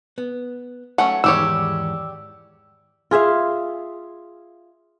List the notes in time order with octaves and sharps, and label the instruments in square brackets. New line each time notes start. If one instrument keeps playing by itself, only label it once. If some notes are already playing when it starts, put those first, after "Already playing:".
[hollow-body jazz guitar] B3
[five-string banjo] F#3 A3 C#4 [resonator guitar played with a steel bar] F#5
[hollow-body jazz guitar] E2 G#2 D#3 [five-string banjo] G3 G4 C#5 [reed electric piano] E6
[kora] F4 G#4 E5 F5